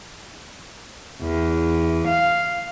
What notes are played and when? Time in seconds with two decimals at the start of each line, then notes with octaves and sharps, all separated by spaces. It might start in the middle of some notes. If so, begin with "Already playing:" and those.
1.21 E2
2.08 F5